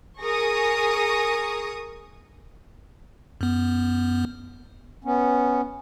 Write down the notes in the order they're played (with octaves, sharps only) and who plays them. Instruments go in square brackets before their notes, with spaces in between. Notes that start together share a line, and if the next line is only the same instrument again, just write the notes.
[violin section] G#4 A#4 C#6 D#6 A#6
[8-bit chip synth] F#2 B3
[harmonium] B3 C#4